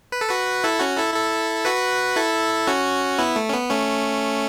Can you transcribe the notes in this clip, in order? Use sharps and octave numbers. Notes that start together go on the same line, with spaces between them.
B4
A4
F#4 B4
E4 A4
C#4 F#4
E4 A4
E4 A4
F#4 B4
E4 A4
C#4 F#4
B3 E4
A3
C#4
B3
A3 C#4